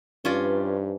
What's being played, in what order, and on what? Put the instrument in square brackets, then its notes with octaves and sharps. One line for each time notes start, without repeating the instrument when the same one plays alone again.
[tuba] G2 [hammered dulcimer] E3 F3 D#4 [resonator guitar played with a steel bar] C#4 F4 D5